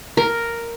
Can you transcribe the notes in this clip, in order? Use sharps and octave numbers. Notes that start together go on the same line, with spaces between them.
A#4